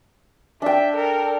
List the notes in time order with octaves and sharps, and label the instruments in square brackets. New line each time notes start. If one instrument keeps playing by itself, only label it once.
[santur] D4 G5 [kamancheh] E5
[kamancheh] A4 A#4